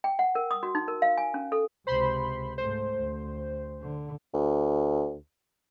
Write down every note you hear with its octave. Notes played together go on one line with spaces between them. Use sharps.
G5
F#5
A#4
D#6
F#4
D#4
A#4
F5
G#5
C#4
A4
C#2 C3 C5 B5 C6
G#2 A3 C5
D2
D3
D2